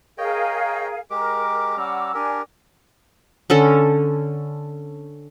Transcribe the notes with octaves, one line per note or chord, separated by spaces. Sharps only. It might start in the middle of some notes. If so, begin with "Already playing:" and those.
G#4 A#4 C#5 D#5 F5 G5
G#3 G4 A#4 D6
G3 C#4 F#5 A#5 D6 E6
D4 G4 A#4 G#5
D3 C#4 A4